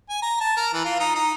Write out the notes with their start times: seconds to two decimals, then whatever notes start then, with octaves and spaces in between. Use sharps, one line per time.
0.09 G#5
0.22 A#5
0.40 A5
0.57 A#4
0.73 E3
0.85 F4
1.00 D#4
1.15 D#4